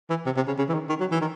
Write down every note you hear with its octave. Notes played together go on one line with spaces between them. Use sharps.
E3
C3
C3
C#3
C#3
E3
D#3
D#3
F#3
E3
D#3